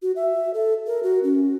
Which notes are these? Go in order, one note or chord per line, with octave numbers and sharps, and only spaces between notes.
F#4
E5
A4
A#4
F#4
C#4